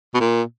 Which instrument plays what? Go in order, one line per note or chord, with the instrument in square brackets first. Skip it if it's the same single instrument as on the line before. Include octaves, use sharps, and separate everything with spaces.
[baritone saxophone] B2
A#2